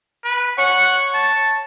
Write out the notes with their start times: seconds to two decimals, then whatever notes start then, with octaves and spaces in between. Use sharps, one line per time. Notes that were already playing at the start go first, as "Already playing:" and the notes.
0.25 B4
0.59 C#5 F#5
1.14 A5